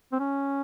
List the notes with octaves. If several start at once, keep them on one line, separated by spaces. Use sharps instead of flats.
C4
C#4